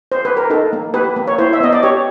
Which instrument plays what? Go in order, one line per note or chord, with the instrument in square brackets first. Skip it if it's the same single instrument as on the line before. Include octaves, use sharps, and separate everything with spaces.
[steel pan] C5
B4
A#4
D#4 A4
A#3
G4 B4
A#3
C#5
E4 C5
E5
B3 D#5
D5
G4 C#5